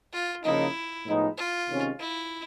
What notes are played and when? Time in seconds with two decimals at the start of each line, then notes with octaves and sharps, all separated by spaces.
0.13 F4
0.44 C#3 F3 A#3 D#4 E4
1.06 A2 F3 G#3 B3 D#4
1.37 F4
1.68 C3 D#3 G#3 C#4
2.00 E4